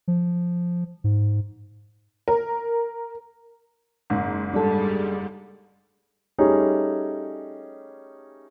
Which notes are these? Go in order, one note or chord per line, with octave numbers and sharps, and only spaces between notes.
F3
G#2
A#4
F#1 G#2
G3 G#3 D4 A4
G3 A3 C#4 D#4 G4 G#4